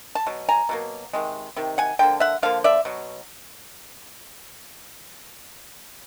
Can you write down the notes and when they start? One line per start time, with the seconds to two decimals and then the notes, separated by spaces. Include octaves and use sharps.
0.15 A5
0.26 B2 F#3
0.49 G#5 A#5
0.69 B2 F#3 A#3
1.13 C3 D#3 G#3
1.56 C3 D#3
1.78 F#5 G#5
1.99 D3 F3 A#3 G5
2.20 E5 F#5
2.43 D3 F3 A#3 F5
2.64 D5 E5
2.85 B2 F#3